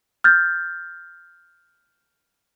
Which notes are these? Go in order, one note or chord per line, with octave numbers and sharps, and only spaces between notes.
F6 G6 A6